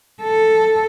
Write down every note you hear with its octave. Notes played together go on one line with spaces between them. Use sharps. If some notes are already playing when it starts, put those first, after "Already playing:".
A4